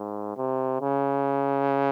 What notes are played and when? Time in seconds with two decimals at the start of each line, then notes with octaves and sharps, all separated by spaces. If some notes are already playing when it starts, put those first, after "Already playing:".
Already playing: G#2
0.37 C3
0.81 C#3